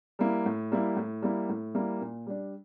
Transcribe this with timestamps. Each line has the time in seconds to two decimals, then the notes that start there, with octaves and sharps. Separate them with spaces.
0.19 G3 A#3 E4
0.46 A2
0.72 G3 A#3 E4
0.96 A2
1.22 G3 A#3 E4
1.49 A2
1.75 G3 A#3 E4
2.01 A#2
2.27 G3 D4